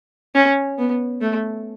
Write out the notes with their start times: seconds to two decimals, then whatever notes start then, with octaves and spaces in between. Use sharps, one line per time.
0.35 C#4
0.78 B3
1.21 A3